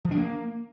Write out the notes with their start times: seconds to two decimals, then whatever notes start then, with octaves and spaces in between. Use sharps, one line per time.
0.05 F3
0.11 D4
0.17 A#3